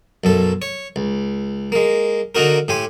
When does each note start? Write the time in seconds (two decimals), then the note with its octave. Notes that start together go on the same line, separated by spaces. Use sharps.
0.24 B1 F#2 A4
0.62 C#5
0.96 C#2
1.72 G#3 A#3
2.35 D3 A#3 D#4 F#4 A#4
2.68 A2 G4 G#5 C6